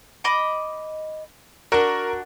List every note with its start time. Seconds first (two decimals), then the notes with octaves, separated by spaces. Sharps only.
0.24 D#5 B5 D6
1.72 D4 F#4 A#4